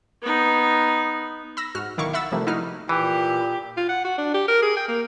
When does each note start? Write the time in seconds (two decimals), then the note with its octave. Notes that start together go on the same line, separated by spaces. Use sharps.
0.22 B3 D#4
1.57 B5 E6 A#6
1.75 G#2 F#4 F6
1.97 B1 D#3 E4 F5 C#6 D6
2.13 E5 F#5 B5 E6 A6
2.32 C3 F3 G3 A3 A#3
2.47 D#4 E4 F#4 B4 F6
2.89 A#2 E3 G4
3.77 F4
3.89 F#5
4.05 F#4
4.18 D4
4.34 G4
4.49 A#4
4.63 G#4
4.77 G5
4.89 A#3